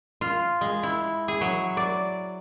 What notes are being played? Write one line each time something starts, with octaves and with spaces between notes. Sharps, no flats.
F4
G#3
E4
G#4
F#3
D5